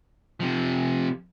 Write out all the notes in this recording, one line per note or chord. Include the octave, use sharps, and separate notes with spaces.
C3 F3